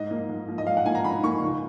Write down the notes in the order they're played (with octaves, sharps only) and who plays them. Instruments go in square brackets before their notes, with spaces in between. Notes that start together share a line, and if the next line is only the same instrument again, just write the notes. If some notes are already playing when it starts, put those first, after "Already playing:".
Already playing: [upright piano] G#2 D#5
F3 A#3
G#2
F3 A#3
D#5
G#2 F5
F#5
F3 A#3 G#5
A#5
G#2 B5
F3 A#3 C#6
C#2